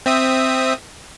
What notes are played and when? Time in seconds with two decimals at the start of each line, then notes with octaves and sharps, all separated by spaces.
0.06 C4 E5 D#6